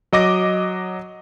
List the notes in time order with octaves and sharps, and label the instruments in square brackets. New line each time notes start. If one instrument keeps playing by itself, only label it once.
[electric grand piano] F#3 D#5 D6 A#6